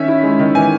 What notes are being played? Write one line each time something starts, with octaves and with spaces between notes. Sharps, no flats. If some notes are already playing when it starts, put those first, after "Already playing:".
Already playing: D#3 C#4 E5
E4
G#3
D#3
E3 G#5